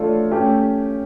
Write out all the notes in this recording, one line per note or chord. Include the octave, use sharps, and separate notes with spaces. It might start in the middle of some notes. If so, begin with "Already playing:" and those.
Already playing: A3 D4 F4 A4 C#5
A3 C#4 G4